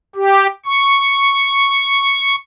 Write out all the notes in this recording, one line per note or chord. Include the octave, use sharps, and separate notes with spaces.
G4
C#6